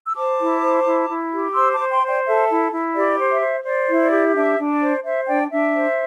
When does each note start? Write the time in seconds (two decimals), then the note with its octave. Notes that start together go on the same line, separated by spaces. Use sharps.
0.05 E6
0.15 C5 A5 D6
0.39 E4
0.62 C5
0.85 E4
1.09 E4
1.32 G4
1.55 C5 C6 E6
1.73 A5 D6
1.79 C5
1.90 G5 C6
2.02 C5
2.08 D5 G5
2.25 A4 E5
2.49 E4
2.72 E4
2.95 G4 D5
3.18 C5
3.30 E5
3.41 C5
3.65 C5 D5
3.88 E4
4.00 D5
4.11 G4
4.34 D4 E5
4.58 D4
4.70 D5
4.81 C5
5.04 C5 E5
5.27 D4 D5 G5
5.50 D4 E5
5.74 C5